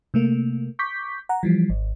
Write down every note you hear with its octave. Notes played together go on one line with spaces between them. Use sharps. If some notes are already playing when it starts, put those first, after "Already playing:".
C3 A3 A#3
C#6 D6 G6 B6
F#5 A#5
E3 F3 G3
G#1